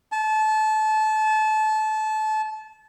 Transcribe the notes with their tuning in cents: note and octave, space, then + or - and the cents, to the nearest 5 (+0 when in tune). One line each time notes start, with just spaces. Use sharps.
A5 -25